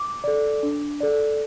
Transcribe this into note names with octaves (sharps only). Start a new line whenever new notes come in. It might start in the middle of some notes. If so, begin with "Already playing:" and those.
Already playing: D6
A4 D5
D4
A4 D5